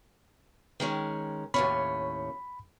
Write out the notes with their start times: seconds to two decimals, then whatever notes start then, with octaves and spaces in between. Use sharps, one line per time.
0.80 D#3 G#3 C#4
1.54 D#2 A2 C#4 B5